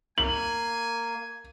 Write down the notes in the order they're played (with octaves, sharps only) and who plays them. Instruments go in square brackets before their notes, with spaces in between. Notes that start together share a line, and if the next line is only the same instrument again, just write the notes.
[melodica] A#3 [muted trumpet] G#5 [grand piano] F#7